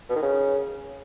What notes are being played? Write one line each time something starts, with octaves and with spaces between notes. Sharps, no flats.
B2
D#3
C#3